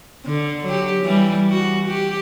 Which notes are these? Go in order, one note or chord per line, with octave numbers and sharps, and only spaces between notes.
D3
F#3 G4
E3 G3
F#4
G4